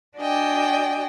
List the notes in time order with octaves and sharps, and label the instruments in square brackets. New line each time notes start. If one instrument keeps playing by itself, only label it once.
[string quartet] D4 F#4 D5 D#5 G5 G#5